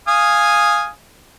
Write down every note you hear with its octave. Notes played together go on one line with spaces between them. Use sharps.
F5 G#5 D#6